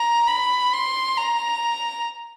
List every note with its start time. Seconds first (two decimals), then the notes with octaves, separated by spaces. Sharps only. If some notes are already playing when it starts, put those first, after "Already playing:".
Already playing: A#5
0.27 B5
0.73 C6
1.18 A#5